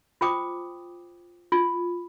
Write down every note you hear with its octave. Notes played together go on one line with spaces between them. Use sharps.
F4 C5 G5 D6 D#6
F4